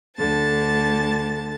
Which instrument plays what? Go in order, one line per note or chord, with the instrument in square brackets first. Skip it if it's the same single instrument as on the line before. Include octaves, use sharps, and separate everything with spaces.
[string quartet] D2 D3 A5 A6